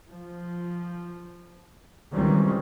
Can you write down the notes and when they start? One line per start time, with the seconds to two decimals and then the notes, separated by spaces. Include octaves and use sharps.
0.11 F3
2.14 C#2 D#3 E3 G3 C4 C#4